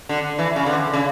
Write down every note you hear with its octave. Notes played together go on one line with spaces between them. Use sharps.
D3
E3
C#3
D3
C#3